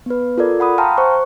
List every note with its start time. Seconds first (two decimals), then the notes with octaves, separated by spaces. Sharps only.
0.06 B3 B4
0.38 F4 A4 A#4 D5
0.60 F#5 B5 D#6
0.78 F5 G5 A5 A#5 C6 F6
0.98 C5 C#6